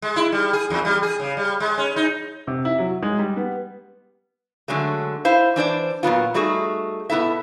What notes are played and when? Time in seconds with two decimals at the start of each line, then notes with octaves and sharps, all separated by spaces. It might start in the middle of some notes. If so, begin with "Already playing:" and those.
0.02 G#3
0.16 E4
0.32 G3
0.53 G#4
0.70 E2
0.85 G3
1.03 G#4
1.20 C#3
1.37 G3
1.60 G#3
1.78 C#4
1.96 D#4
2.47 C3
2.65 E4
2.79 F#3
3.02 G#3
3.19 G3
3.37 B3
4.68 D3 F#3 G#3 A3
5.25 E4 C5 F5
5.56 E3 D4 C5 D5
6.03 A#2 F#3 B3 F4
6.34 G3 A3 D#4 F#4 G#4
7.10 B2 B3 E4 A4 E5